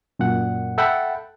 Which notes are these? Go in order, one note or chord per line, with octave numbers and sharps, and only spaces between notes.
F#2 A#2 F#5
A4 E5 F#5 G5 A5 B5